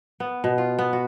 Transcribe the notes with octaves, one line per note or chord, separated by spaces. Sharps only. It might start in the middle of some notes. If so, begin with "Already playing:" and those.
B3
B2
F4
B3
F#4